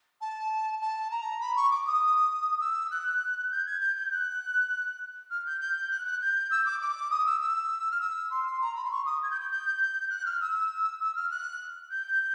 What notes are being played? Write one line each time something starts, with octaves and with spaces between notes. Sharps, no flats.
A5
A5
A#5
B5
C#6
D6
D#6
E6
F#6
G6
G#6
G6
G6
F#6
F6
G6
G6
F#6
F#6
G6
E6
D6
D6
D#6
E6
E6
F6
E6
C6
A#5
B5
C6
C#6
D#6
G#6
G6
G6
G6
F#6
F6
E6
E6
F6
F#6
G6